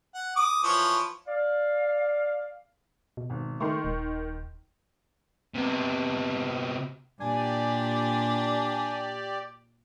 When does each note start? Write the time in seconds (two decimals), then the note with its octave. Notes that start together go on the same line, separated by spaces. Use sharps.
0.14 F#5
0.36 D6 D#6
0.64 E3 F3 C#5
1.28 D5 F5
3.17 B2
3.30 G#1
3.60 D#3 A3 C6 C#6
3.85 D#1
5.54 C3 B3
7.20 A#2 D4 G4 D5 G#5